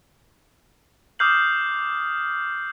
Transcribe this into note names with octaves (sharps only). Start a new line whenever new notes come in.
D6 D#6 F6 G6 C7 F#7